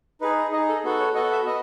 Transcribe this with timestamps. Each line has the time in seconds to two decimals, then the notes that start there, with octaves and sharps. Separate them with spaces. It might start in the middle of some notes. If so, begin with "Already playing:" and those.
0.21 D#4 G#4 B4
0.52 D#4 D#5
0.56 G#4
0.68 A4
0.84 B3 F#4 A4
1.00 C#5
1.15 B3 F#4 A4 D#5
1.32 E5
1.46 B3 D#5